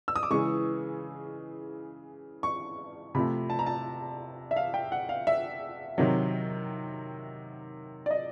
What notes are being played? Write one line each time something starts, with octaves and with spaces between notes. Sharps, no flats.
E6
D#6
D6
C#3 E3 G#3 C#6
C#6
C3 F3 A3 B5
A5
A#5
A5
E5
F5
G5
F#5
F5
E5
C3 D#3 F#3
D5
D#5